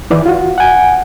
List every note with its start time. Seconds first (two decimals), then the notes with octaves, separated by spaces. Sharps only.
0.10 D#3 E3 D5
0.26 F4 F#4
0.58 F#5 G#5